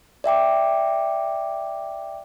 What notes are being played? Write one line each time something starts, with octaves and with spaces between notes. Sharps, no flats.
D5 E5 G5 D6